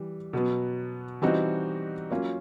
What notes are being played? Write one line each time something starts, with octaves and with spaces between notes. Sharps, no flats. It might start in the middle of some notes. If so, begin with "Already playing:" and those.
Already playing: E3 G3
B2 F#3 B3
E3 G3 C4 D#4 F#4
F#3 A#3 C#4 F4